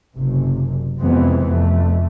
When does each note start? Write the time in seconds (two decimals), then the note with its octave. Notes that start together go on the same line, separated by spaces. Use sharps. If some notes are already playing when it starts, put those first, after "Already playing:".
0.15 F#1 C3
1.00 F2 C3 E3 G#3 B3 C4
1.48 F2 A3